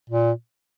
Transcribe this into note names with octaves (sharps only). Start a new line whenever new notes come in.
A#2